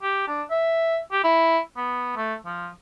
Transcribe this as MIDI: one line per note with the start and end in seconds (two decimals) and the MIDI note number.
0.03 0.26 67
0.28 0.43 62
0.50 0.98 76
1.12 1.23 67
1.24 1.59 64
1.76 2.13 59
2.16 2.34 57
2.45 2.68 53